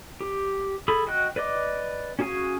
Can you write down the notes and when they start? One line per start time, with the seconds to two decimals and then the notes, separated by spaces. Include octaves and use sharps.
0.21 G4
0.88 G#4 A4 B5
1.07 F#4 D#5 G5 F#6
1.36 B4 D5 D#5 D6
2.19 C#4 F#4 G#4 F5 G#5